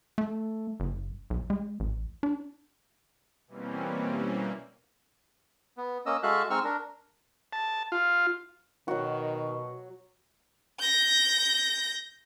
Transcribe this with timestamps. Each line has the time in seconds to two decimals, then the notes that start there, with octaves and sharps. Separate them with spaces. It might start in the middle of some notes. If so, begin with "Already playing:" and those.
0.18 A3
0.80 F#1
1.30 B1
1.50 G#3
1.80 A1
2.23 D4
3.47 B2 E3 G3 A#3 C4 C#4
5.77 B3
6.06 A#3 C#4 D#5 E6
6.23 G#3 F#4 A4 E5 F5 F#6
6.50 G#3 C4 D#4 C#6 E6 F6
6.64 D4 A#4
7.53 A5
7.92 F4
8.88 B2 D#3 F#3 F#4
10.80 G6 A#6